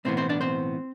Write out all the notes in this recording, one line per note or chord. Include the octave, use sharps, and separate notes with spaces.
B1 A2 E3 B3 C4 C5
C4 C5
D4 D5
C4 C5